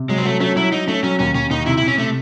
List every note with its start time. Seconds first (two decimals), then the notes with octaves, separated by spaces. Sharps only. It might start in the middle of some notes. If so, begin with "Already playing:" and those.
Already playing: C3
0.09 F#3 G#3
0.18 C4
0.25 F#3 A3
0.40 A3 C#4
0.56 F#3 E4
0.72 F#3 D#4
0.87 A3 C#4
1.03 F#3 C#4
1.19 D#2 C#4
1.34 D#2 C#4
1.50 D#2 D#4
1.66 C3 E4
1.77 E4
1.82 C3
1.88 C#4
1.97 C3 A3